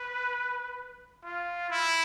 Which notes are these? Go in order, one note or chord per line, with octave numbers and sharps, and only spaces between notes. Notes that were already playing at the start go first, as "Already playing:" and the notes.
Already playing: B4
F4
E4